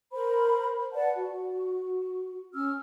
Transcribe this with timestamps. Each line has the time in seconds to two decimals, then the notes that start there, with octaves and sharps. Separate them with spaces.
0.14 A#4 C5 B5
0.93 B4 D5 F#5 A5
1.15 F#4
2.54 C#4 E6 F6